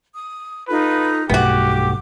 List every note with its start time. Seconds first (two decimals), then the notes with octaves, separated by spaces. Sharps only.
0.14 D#6
0.68 D#4 F4 A4 B4
1.30 B1 G2 A3 B3 F#4 G4 D6